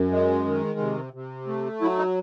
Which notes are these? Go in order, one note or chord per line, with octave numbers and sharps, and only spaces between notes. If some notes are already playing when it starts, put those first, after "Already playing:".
Already playing: F#2
G#3
D#3
C3
C3
A3
F#3 E4
D#4